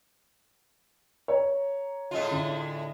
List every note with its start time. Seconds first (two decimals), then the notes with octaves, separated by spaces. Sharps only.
1.28 C#5 A#5
2.11 A2 G#3 F4
2.31 D3